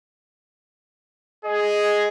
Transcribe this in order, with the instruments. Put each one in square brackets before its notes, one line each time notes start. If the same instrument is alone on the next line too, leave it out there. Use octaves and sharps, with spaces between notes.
[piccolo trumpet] G#4 [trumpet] D#5